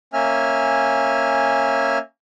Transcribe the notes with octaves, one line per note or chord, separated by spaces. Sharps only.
A#3 C#4 E5 G#5 F6